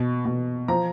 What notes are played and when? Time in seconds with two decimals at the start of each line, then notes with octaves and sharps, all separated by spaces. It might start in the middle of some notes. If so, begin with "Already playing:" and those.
Already playing: B2
0.25 B2
0.68 F3 A#5